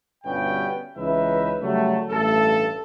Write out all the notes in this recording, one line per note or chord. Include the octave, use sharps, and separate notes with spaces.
G1 G2 B2 B3 C#4 G5
C#2 E3 C#4 D#4 B4 E5
C#3 F#3 G3 A3
A1 G2 A3 A4